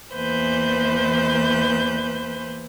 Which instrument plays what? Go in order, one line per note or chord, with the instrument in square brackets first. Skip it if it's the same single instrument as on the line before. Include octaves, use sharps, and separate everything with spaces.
[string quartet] E2 E3 A#3 B4 C5 G6